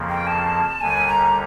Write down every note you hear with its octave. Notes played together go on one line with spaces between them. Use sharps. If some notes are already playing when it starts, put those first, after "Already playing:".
Already playing: F2 C#3 F3 A#3
G5
A5
D#2 D3 G3 G#5
A#5